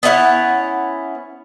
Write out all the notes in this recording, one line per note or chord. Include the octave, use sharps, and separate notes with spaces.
B3 C#4 E4 F#5